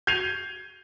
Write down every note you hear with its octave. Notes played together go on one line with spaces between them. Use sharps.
G6 G#6 C7 D#7 F7